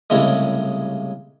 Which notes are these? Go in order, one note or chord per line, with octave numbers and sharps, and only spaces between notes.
C2 A2 C#3 G3 G#3